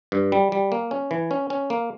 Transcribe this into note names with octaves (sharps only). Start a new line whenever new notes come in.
G2
G3
G3
A#3
C#4
E3
C#4
C#4
A#3